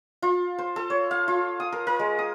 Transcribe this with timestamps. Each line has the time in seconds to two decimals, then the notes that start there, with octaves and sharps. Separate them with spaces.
0.22 F4
0.58 C5
0.76 A4
0.90 C#5
1.11 F5
1.28 F4
1.60 D#6
1.72 A#4
1.87 A#4
1.99 G#3
2.19 D#6